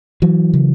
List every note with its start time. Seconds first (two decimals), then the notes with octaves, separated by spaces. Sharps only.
0.22 E3 F#3
0.54 C#3